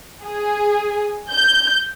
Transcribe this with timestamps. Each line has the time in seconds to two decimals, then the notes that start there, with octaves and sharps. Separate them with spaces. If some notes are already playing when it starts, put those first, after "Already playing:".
0.23 G#4
1.30 G6